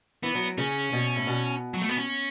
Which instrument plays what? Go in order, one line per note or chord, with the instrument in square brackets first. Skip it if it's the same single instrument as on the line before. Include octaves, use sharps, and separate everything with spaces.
[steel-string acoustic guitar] E3 [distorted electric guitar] B3
[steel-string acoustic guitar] F#3
[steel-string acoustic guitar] C#3 [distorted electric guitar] C#4
[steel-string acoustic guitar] B2
A2
B2
[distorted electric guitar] F#3
A3
B3
C#4